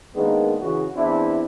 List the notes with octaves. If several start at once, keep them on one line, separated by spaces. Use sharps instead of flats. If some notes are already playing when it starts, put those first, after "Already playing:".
D#3 G#3 A#3 B3 D4
C#3 E3 F#4
E2 C4 D4 E4